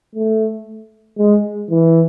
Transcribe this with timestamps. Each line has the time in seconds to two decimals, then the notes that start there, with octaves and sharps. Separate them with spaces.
0.15 A3
1.18 G#3
1.70 E3